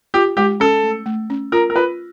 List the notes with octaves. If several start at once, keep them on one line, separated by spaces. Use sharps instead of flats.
F4 G4
G#3 G4
C#4 A4
A3
A3
C#4
F4 A#4
A#4
F4 B4